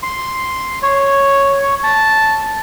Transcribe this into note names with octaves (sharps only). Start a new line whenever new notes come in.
C6
C#5
A5